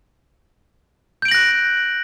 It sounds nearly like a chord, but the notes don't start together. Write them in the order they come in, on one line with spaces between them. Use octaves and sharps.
G6 D7 F#7 A#6 F#6